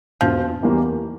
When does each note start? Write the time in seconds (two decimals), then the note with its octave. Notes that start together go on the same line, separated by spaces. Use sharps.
0.21 E1 F3
0.63 E2 E3 G3 A#3